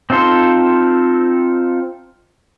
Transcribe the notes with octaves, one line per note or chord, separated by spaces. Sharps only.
C4 D#4 F4 A4 C5